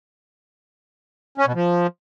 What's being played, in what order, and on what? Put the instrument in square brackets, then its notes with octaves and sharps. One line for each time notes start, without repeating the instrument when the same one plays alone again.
[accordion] C#4
B2
F3